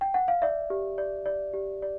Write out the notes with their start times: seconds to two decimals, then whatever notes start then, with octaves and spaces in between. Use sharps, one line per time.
0.01 G5
0.14 F#5
0.28 F5
0.42 D5 E5
0.70 G4
0.98 D5
1.26 D5
1.54 G4
1.82 D5